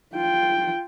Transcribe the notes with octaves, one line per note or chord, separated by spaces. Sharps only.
F4 G5